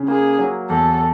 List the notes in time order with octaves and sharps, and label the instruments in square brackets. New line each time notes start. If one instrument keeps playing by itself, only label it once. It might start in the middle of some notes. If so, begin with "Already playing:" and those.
Already playing: [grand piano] C#3
[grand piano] A#3 [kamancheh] G#4
[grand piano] F#3
[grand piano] E2 [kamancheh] A4